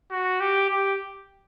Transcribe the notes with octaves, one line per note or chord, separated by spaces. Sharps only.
F#4
G4
G4